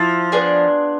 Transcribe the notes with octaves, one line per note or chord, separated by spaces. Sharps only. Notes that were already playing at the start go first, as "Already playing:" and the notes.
Already playing: F3 E4 E5
B3 D4 G#4 D5